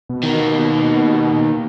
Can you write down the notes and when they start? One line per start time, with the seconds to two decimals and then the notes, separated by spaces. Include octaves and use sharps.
0.09 B2
0.24 D#3 A#3